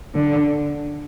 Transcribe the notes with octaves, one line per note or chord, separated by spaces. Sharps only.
D3